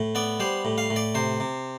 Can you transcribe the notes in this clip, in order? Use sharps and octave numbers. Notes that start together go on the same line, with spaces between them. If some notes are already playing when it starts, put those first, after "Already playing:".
Already playing: A2
B3 D5
G3 C5
A2
F5
A2
D5
C3 C5
C3